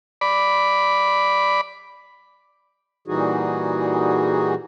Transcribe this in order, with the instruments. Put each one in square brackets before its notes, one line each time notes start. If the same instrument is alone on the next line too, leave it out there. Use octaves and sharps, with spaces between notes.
[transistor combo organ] D5 B5
[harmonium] A#2 E3 G3 D#4 F#4 G#4